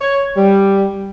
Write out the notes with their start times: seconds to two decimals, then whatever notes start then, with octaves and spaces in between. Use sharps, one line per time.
0.01 C#5
0.36 G3